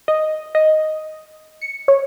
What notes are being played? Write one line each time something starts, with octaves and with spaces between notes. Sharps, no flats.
D#5
D#5
C#7
C#5